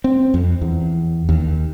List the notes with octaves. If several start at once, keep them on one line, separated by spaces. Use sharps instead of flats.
C4
F2
E2
D#2